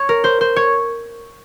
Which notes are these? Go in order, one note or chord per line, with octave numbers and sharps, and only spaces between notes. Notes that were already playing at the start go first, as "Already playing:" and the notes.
Already playing: C#5
A#4
C5
C5
C#5